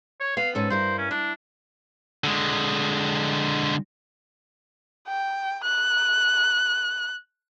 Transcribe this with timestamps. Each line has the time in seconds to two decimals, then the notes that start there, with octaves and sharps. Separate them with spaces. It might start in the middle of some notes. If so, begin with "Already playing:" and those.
0.20 C#5
0.37 B3 F5
0.55 G#2 B3 C#4 A4
0.70 G2 E4 A#4 C5
0.98 C#4
1.11 D4 E4
2.24 D3 G#3
5.08 G5
5.64 F#6